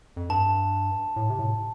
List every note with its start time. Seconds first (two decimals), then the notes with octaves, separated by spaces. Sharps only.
0.16 F2
0.29 G2 A5
1.16 A2
1.30 C3
1.39 A2